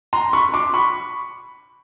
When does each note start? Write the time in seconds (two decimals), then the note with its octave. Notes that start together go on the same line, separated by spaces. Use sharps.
0.13 A#5 C6
0.33 B5 C#6
0.54 C6 D6
0.74 B5 C#6